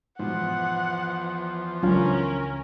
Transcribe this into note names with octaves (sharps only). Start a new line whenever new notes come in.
E2 G#2 B2 F3 F#5
C#2 E3 F#3 C#4 D4 F4 A#4